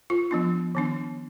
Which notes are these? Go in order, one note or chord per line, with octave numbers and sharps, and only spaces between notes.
F4
F3 B3 D4
D#3 B3 D4